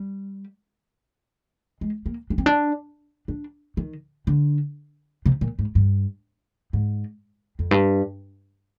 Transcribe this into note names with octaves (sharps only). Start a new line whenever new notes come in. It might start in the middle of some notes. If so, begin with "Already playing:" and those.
Already playing: G3
G#3
A#3
D4
C4
D4
D4
D#3
D3
C3
A#2
G#2
G2
G#2
F2
G2